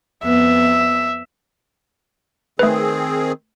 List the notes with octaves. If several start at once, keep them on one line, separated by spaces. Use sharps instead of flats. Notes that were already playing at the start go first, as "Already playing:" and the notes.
F2 B3 E5
D#3 A3 C4 G#4 B4